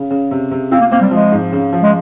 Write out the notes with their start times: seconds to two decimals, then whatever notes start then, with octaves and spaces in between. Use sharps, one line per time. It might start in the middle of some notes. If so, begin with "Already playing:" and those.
Already playing: C#3
0.10 C#3
0.31 C3
0.51 C3
0.71 C4 F4
0.81 A#3
0.91 A#3 C4
1.02 G3
1.11 F3 G#3
1.32 G#2
1.52 C#3
1.73 F3
1.83 G#3